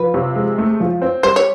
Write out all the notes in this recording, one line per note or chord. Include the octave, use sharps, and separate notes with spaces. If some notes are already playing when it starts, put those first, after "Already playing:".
Already playing: F3 B4
C3
G#3
A3
F3
C4
G3 C5
C#5